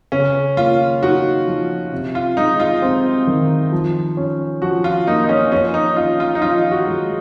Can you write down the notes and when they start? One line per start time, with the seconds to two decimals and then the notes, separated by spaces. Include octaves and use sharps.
0.12 C#3 C#4
0.57 A#3 F4
1.02 D#4 F#4
1.47 F3
1.92 C3
2.15 F4
2.37 G#3 D#4
2.60 F4
2.82 C4
3.27 D#3
3.72 F3
4.17 C#4
4.62 F3 F#4
4.84 F4
5.07 A#3 D#4
5.24 D#4
5.29 C#4
5.52 F3 C#4
5.74 D#4
5.96 C#4 F4
6.20 F4
6.35 D#4
6.42 F3 F4
6.71 F#4
6.87 G#3